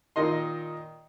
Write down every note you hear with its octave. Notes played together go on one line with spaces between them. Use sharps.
A#2 D#3 D#5 C6